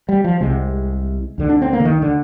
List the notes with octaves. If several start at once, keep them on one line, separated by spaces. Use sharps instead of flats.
G3
F3
C2 C3 G#3
D2 D3
D4
C4
A#3
D3
D#3
D3